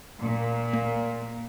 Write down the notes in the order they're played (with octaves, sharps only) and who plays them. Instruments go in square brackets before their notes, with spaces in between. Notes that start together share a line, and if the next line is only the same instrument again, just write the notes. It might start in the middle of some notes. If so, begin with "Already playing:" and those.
[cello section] A#2
[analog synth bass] A#3